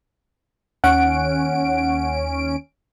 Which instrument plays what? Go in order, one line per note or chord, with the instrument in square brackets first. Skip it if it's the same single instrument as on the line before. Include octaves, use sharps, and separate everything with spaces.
[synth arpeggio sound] D#2 C#4 D7 [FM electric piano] F#5